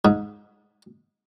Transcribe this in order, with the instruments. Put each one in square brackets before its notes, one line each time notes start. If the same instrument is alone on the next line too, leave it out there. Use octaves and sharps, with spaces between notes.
[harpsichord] G#2